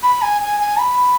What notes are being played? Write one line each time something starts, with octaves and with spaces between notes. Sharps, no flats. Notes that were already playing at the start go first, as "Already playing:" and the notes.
B5
G#5
G#5
G#5
B5